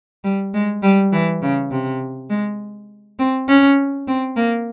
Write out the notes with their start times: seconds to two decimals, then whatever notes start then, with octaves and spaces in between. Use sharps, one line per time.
0.24 G3
0.54 G#3
0.83 G3
1.13 E3
1.42 C#3
1.71 C3
2.30 G#3
3.19 C4
3.49 C#4
4.08 C4
4.37 A#3